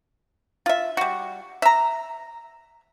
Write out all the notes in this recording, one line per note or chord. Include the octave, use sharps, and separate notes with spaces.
F4 E5
G3 F#4
E5 A#5